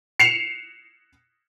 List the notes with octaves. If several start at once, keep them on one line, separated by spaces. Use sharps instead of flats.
C7 C#7 E7 F7